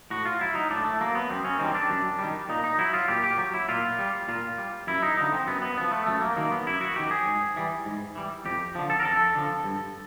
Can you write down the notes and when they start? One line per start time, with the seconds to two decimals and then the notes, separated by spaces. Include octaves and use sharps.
0.10 A2 F#4
0.26 F4
0.40 F#3 E4
0.55 D#4
0.70 A2 D4
0.84 A3
1.00 F#3 A#3
1.15 B3
1.30 F#2 C4
1.45 C#4
1.59 D#3 G3 C4
1.74 D4
1.90 F#2
2.19 D#3 G3
2.49 A#2 D#4
2.64 D#4
2.78 F#3 E4
2.94 F4
3.08 A#2 G4
3.24 G4
3.38 F#3
3.54 E4
3.68 A#2 F4
3.99 G3
4.28 A#2 F4
4.58 G3
4.87 F#2 E4
5.02 D#4
5.17 D3 F3 D#4
5.32 C4
5.47 F#2 B3
5.62 B3
5.77 D3 F3 B3
5.92 A3
6.07 F#2 A3
6.21 A#3
6.36 D#3 F#3 A#3
6.51 B3
6.66 F#2 E4
6.81 F#4
6.96 D#3 F#3 G4
7.11 G#4
7.26 G#2
7.56 E3 G3
7.85 G#2
8.15 E3 G3
8.45 F2 G4
8.75 D3 F3
8.90 A4
9.00 A#4
9.04 F2 A4
9.35 D3 F3
9.64 G2